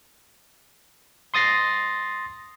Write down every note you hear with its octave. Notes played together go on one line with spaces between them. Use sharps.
C6 D#6 A6 A#6 C7